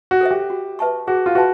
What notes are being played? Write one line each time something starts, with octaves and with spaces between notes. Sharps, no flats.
F#4
A4 C5 E5
G4
F#4
B4 E5 A5 C#6
F#4 G#4
F4
F#4 B4 E5 A5 C6